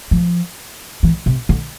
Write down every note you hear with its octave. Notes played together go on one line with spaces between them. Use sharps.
F3
E3
C3
D3